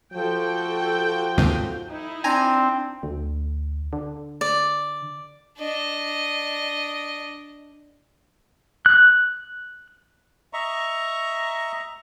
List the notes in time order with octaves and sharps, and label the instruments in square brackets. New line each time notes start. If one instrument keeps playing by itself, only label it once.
[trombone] F3 [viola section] F#4 A4 G5
[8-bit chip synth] D#2 G#2 C3
[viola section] D#4 E4
[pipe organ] C4 [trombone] D4 [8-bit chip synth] G#5 A#5
[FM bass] D2
D3
[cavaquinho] D5
[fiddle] D4 D#5
[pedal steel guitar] F#6
[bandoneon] D#5 E5 A#5 C#6